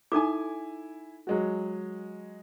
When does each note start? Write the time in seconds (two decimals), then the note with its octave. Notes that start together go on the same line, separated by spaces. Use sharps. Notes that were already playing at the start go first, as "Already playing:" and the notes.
0.12 D#4 E4 A4 G#5 D6
1.27 F#3 G#3 F#4